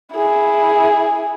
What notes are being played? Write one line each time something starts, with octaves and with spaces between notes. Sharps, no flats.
E4 G#4